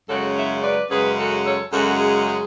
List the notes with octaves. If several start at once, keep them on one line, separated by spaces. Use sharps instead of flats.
F#2 C#3 G#3 C#4 F#4 A4
C#5 E5
B4 D5
F#2 C#3 G#3 C#4 G#4 B4
F#4 A4
A4 C#5
F#2 C#3 G#3 C#4 F#4 A4
G#4
G#4